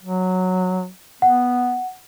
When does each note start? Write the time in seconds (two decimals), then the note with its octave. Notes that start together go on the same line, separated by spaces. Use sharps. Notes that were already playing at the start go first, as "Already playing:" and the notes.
0.03 F#3
1.22 B3 F#5